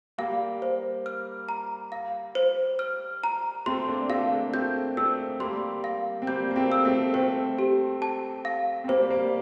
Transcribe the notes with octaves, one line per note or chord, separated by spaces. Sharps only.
G3 A#3 F5
C5
F6
A#5
F5
C5
F6
A#5
A3 C4 C6
A#3 D4
A3 C4 F5
A#3 D4
A3 C4 G6
A3 C4 E6
G3 A#3 C6
F5
C4
G3 A#3 G6
A#3
A3 C4
E6
A3 C4
A3 C4 C5
G4
A5
F5
C4
G3 A#3 C5
G3 A#3